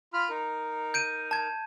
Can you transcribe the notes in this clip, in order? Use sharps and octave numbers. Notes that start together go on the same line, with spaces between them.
F4 B5 F6
D#4 A#4
G6 D7 D#7
A5 G#6